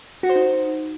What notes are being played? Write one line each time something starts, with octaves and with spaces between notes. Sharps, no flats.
F#4
C5
D#4